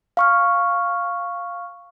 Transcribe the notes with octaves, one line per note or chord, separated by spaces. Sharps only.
F5 C#6 F6